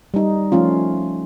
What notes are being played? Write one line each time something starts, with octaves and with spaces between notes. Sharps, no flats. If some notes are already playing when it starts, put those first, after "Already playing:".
G3 D#4
F3 A3 C#4 F4